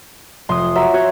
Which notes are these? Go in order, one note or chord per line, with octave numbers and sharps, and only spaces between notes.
F1 C6 D#6
F#3 E5
F#4 C#5